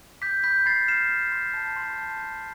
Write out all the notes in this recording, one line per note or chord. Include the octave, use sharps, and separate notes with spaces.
D6 G6 B6
B5 G6 B6
B5 A6 C7
F6 C7 E7
F6
C6
A5
C6
A5
G6